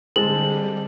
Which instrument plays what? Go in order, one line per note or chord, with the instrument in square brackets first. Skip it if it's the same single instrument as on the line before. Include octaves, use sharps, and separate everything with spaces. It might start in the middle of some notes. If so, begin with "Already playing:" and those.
[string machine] D3 G3 [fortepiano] G#3 [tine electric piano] C4 D#5 A5 [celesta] F#7